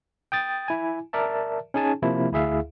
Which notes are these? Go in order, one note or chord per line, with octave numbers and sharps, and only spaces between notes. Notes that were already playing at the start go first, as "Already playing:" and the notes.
G5 D#6 A6
E4 G#5
A#4 D5 E5 A5
C#4 D#4 G#4 G#5 A5
C3 F3 A#3 E4
D2 E4 G#4 E5 F5